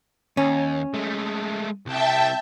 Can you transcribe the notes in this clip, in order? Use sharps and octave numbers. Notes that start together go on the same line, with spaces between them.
D#2 C#4
G#3 A3
C2 E5 G5 A5